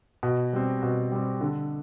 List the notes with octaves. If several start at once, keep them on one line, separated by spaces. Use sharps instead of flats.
B2
G3 C4
B2
G3 C4
D3